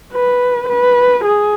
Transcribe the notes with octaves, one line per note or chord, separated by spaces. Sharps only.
B4
B4
G#4